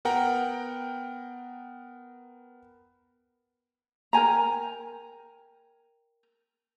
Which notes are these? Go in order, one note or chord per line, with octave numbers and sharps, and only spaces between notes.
B3 A#4 F#5 G5 A#5
A#4 G5 G#5 A#5